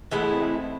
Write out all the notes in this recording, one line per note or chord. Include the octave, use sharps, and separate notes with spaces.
E3 G#3 A3 B3 E4
A3
C4
A3